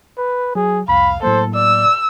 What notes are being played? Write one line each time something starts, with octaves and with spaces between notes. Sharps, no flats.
B4
F#3 G#4
C2 F2 F5 B5
A2 F#3 A#3 A4 C5
D5 E6